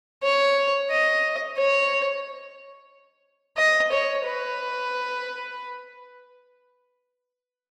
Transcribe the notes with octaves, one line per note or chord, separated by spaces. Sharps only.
C#5
D#5
C#5
D#5
C#5
B4